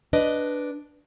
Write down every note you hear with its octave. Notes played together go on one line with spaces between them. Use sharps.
D4 B4 D5 D#5